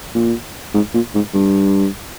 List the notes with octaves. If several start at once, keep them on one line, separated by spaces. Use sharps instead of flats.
A#2
G#2
A#2
G#2
G2